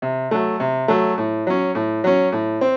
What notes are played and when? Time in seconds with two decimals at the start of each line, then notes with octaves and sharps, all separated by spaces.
0.02 C3
0.31 F#3 A3
0.60 C3
0.88 F#3 A3
1.18 A2
1.47 F#3 C#4
1.75 A2
2.04 F#3 C#4
2.32 A2
2.61 C4